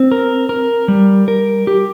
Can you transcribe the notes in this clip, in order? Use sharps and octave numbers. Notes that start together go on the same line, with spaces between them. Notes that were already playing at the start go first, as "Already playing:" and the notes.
Already playing: C4
A#4
A#4
G3
A#4
G4